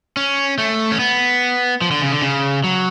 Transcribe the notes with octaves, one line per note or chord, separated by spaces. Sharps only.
C#4
A3
C#4
B3
F3
D3
C#3
D3
C#3
F#3